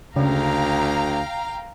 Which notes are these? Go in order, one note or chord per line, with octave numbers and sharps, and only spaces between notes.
D2 C#3 F5 G5 A#5